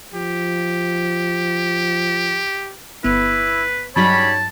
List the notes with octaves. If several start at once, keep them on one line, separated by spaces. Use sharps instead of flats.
F3 G4
G1 B3 E4 B4
G2 C#3 F#3 G3 D#4 C#5 A5 B5